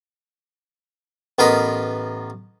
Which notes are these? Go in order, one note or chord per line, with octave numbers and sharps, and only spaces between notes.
A1 B3 F4 A#4 D#5 B5